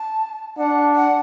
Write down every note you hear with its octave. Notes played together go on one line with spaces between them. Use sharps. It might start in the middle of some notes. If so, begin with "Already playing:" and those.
Already playing: A5
D4 F#5
F#5